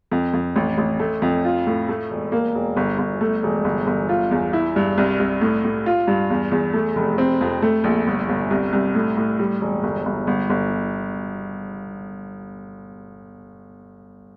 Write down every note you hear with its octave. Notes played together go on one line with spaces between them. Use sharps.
F2
F2
A1
A1
A3
F2
F4
A2
A3
E1
A#3
E1
G1
G1
A3
E1
G1
G1
F4
E2
E4
G2
C2
C2
A2
A2
F4
G2
E2
E2
A3
F1
C4
F2
A3
A#1
G1
G1
C2
C2
A2
A2
G3
E1
G1
G1
G1
G1